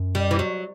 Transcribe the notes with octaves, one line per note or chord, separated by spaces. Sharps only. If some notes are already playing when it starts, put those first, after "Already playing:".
Already playing: F#2
G3
E3
F#3